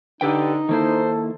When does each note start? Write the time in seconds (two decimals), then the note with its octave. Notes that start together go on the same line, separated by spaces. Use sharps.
0.21 D3 D#4 G4 B4 G5
0.69 D#3 A#3 E4 A4 C5